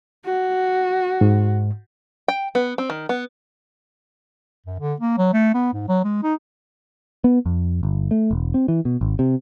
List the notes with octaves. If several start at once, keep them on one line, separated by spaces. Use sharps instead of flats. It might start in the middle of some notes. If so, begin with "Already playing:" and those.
F#4
G#2
G5
B3
C4
D#3
B3
F#2
D3
A#3
F#3
A3
B3
G#2
F#3
G#3
D#4
B3
F2
G1
A3
E1
C4
E3
B2
G#1
C3